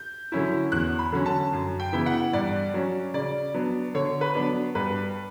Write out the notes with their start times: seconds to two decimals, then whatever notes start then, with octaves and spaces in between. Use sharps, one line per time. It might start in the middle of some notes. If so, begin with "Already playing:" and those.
Already playing: G6
0.32 D3 F#3 C#4 E4
0.72 E2 F#6
0.99 B5
1.12 D3 F#3 C#4
1.26 A5
1.53 F#2
1.80 G5
1.93 C#3 E3 B3 E4
2.06 F#5
2.33 G2 D5
2.74 F#3 C#4
3.14 C#3 D5
3.54 F#3 B3 D4
3.94 D3 C#5
4.21 B4
4.35 F#3 B3 D4
4.75 G2 B4